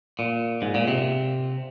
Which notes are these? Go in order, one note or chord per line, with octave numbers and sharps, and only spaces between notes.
A#2
G#2
A#2
C3